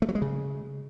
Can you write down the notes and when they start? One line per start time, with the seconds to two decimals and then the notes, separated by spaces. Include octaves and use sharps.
0.02 A3
0.09 F#3
0.15 G#3
0.22 C#3